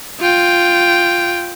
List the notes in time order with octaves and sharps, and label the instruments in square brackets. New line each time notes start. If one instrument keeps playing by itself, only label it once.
[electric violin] F4 G5